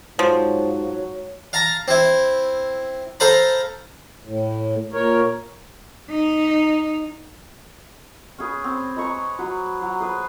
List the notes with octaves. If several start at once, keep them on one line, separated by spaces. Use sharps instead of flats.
G#2 F3 F#3
F5 A5 A#5
C4 E4
A4 C5 F5 A#5 B5
A2
A#2 A#4 C#5
D#4
C#4 G#4 B4
C4
G#3 B4 A#5 C#6
F#3 B4 C5
F#3
G#4 B4 C5